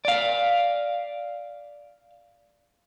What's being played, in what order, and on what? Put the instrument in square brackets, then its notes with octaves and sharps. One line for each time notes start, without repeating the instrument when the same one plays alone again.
[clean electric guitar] D5 F5